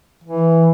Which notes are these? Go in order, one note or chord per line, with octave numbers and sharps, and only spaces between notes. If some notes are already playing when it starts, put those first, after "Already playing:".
E3